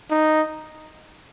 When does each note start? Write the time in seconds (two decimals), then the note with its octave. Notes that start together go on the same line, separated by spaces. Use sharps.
0.11 D#4